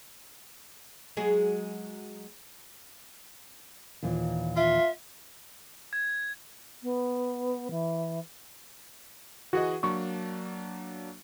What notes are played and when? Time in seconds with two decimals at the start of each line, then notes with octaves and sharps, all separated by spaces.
1.17 F#3 G#3 G#4
4.03 D#2 A#2 E3
4.56 F4 E5
5.93 G#6
6.82 B3
7.70 E3
9.53 E3 F#4 G#4 D#5
9.83 F#3 A#3 D4 C#6